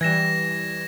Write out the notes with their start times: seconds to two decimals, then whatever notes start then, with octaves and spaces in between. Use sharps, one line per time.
0.01 E3 G3 G#6 A#6 E7